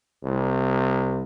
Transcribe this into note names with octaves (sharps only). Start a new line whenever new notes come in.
C2